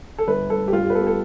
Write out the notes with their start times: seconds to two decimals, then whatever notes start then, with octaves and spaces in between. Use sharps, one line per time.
0.18 A4
0.27 G1 B4
0.50 G1 A4
0.68 G4
0.73 G2 F4
0.84 G4
0.90 B4
0.95 B3 A4
1.02 G4
1.07 A4